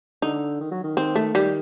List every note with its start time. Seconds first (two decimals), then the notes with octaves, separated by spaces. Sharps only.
0.22 D3 D#4
0.60 D#3
0.71 F#3
0.83 D#3
0.97 D#3 C4
1.15 A3
1.34 D#3 G3